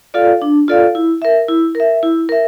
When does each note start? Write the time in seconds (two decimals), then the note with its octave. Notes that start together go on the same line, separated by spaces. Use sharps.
0.14 F4 A4 D5 F5
0.42 D4
0.68 F4 A4 D5 F5
0.95 E4
1.22 A#4 E5
1.48 E4
1.75 A#4 E5
2.03 E4
2.29 A#4 E5